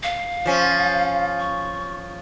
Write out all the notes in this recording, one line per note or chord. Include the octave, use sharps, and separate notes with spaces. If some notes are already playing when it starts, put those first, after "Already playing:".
F5
F3 C#4
C#6